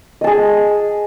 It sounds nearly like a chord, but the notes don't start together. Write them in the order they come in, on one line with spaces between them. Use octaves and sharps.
D#5 A5 G#4